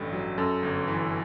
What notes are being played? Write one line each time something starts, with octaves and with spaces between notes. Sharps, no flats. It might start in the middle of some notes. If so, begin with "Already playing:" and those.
Already playing: A1 G2 A4
F#3
F#2 A4
G1
E3